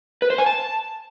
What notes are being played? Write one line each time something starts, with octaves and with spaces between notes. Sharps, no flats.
B4
C5
G#5
A5